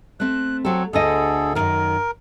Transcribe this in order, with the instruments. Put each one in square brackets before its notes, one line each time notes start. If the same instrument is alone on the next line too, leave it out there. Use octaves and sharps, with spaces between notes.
[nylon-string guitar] A3 C4 [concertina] F#6
[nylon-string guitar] F#3 A4 [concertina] C4
[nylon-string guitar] D2 D3 D#5 [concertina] G#4 A4
[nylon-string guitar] F#2 D#3 [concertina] A#4